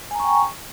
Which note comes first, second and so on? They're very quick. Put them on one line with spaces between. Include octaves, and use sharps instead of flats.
G#5 A#5 C#6 G5